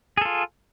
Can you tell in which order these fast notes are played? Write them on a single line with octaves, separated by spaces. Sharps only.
G#4 A4 F4